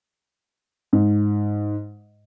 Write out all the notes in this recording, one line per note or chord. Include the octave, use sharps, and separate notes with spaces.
G#2